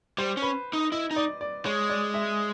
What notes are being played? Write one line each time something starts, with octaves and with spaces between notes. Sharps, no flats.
G3 C5
C#4
B4
D#4
E4 D#5
D#4
D5
D5
G#3 C#5
D5
E5